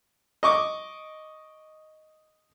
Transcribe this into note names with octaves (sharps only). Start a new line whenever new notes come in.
D#5 C#6 D6